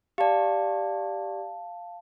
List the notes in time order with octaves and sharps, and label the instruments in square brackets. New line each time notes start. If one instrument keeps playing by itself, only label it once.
[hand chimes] G4 D5 [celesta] F5 A5